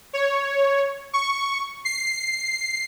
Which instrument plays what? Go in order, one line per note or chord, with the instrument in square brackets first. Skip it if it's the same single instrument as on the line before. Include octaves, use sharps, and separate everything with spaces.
[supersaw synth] C#5
C#6
C7